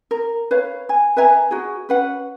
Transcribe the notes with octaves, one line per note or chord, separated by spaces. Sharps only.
A#4
B4 C#5 F5
G#5
B4 E5 G#5 A#5
F#4 G#4
C#4 B4 F#5